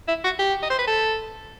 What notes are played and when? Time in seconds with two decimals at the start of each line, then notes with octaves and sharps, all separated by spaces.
0.08 E4
0.24 F#4
0.39 G4
0.63 D#5
0.70 C5
0.79 B4
0.87 A4